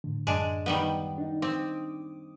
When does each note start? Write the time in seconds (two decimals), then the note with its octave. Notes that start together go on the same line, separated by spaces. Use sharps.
0.04 A2 D3
0.27 F#2 G#3 D4
0.66 D#3 G3 B3
1.18 D4 D#4
1.42 C4 D6 D#6